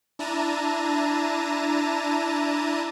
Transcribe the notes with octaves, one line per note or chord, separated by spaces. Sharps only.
D4 E4 A5 A#5 D#7